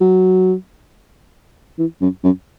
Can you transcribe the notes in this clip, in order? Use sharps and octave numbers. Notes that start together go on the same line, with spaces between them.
F#3
E3
F#2
F#2